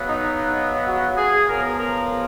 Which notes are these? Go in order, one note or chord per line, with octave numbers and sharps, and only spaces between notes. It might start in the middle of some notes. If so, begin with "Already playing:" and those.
Already playing: C#3 F#3 B3
D#4
F#4
G#4
C#3 F3 B3 A#4
A#4